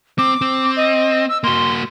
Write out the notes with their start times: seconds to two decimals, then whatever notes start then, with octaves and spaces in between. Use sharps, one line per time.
0.18 C4 D6
0.41 C4
0.77 D#5
1.29 E6
1.44 A#3 F#4 C6